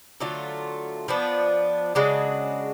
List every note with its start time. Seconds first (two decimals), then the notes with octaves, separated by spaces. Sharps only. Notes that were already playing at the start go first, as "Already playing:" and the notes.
0.20 D3 F#3 A3 F4
1.08 F3 B3 D4
1.95 C#3 G#3 D4 F#4